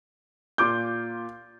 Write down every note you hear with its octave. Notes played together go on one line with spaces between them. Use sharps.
A#2 F4 D6 G6